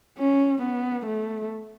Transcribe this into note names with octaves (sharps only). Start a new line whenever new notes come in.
C#4
B3
A3